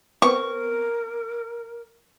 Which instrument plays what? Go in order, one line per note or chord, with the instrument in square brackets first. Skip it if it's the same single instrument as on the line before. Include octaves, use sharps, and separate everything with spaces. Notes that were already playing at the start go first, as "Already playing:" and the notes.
[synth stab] B3 C4 [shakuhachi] A#4 [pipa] C#6